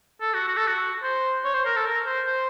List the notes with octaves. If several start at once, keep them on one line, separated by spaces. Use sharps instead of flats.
A4
F#4
F#4
A4
F#4
C5
C#5
C5
A#4
A4
A#4
C5
C5